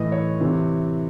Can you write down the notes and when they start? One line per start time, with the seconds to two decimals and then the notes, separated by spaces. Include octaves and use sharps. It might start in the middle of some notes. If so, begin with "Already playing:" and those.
Already playing: A2 E3 D#5
0.12 C#5
0.41 C3 E3